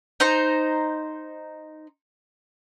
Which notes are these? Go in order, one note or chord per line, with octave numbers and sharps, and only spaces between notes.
D#4 C5 A#5